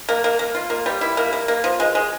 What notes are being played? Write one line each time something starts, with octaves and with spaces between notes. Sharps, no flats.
A#3
A#3
A#3
F4
A#3
G3
E4
A#3
A#3
A#3
F3
G#3
G#3